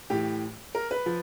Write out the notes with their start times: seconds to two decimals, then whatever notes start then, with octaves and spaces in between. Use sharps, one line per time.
0.10 A2 E3 G4
0.75 A#4
0.91 B4
1.06 F3